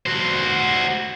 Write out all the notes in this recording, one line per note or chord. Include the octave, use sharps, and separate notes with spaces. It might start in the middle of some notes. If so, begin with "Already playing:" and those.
F#4 C5